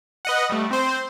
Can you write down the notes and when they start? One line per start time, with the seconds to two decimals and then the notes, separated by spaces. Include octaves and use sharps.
0.25 B4 D#5 F#5
0.50 G3 A3
0.71 C4 C5